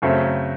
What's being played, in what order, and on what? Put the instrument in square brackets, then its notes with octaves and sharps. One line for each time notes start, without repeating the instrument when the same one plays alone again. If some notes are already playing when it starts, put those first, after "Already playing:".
[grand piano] F#2 C#3 F#3 A3 C4